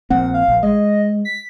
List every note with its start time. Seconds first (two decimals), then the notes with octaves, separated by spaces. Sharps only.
0.10 A#1 A#2 C4 F#5
0.34 F5
0.48 A#1
0.63 G#3 D#5
1.25 B6